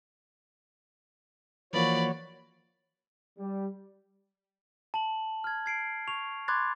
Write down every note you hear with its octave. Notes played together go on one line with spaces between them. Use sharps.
E3 F3 A#3 F#4 C#5 D5 B5
G3
A5 F#7
F6 G#6
G#6 C7 D7
C#6 F7
B5 C6 D6 F#6 G#6 A6